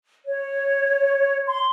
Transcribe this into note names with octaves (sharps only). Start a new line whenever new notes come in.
C#5
C6